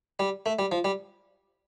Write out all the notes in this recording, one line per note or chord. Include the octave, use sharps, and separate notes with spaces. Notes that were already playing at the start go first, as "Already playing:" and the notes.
G3
A3
G3
F3
G3